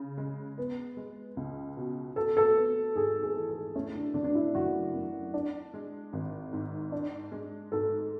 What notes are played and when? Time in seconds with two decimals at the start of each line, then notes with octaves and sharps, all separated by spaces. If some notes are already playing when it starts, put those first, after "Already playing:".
Already playing: C#3
0.18 G#3
0.58 B3
0.97 G#3
1.37 C#2
1.77 B2
2.16 F#4 A4
2.37 A4
2.56 B3
2.95 G#2 G#4
3.23 G#4
3.36 E3
3.49 A4
3.76 A3 C#4
3.95 D4
4.14 D3 D4
4.24 D4
4.35 E4
4.55 F#1 F#4
4.94 F#2
5.34 D4
5.74 G#3
6.13 G#1
6.53 G#2
6.92 D4
7.32 G#3
7.72 G#2 A4